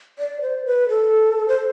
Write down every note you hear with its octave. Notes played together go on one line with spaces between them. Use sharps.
D5
C5
B4
A4
C5